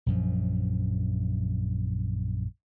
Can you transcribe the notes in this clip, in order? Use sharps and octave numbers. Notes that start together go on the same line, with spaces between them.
A#1 F#2 F3